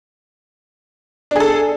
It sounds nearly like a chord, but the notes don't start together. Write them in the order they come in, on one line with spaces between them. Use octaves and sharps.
D4 G#4 A4